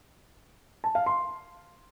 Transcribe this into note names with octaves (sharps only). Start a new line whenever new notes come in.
A5
F5
C6